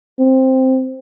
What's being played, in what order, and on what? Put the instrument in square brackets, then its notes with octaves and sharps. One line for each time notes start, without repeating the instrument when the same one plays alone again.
[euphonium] C4